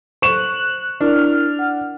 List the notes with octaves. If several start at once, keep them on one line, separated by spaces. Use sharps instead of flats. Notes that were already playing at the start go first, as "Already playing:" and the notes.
C5 C#6 F#6 E7
D4 E4 A#4 F6
F#5